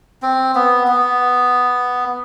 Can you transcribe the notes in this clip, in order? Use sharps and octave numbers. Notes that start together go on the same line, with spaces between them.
C4
B3
B3